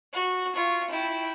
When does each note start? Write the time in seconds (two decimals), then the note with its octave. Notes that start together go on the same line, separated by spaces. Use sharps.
0.13 F#4
0.56 F4 C#6
0.90 E4 G5